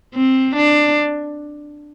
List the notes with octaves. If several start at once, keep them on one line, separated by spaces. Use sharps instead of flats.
C4
D4